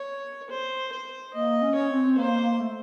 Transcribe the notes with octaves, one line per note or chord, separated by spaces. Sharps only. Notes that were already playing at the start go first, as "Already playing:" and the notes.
Already playing: C#5
C5
C5
A#3 D#5
C#4
C#5
C4
A#3 C5
A3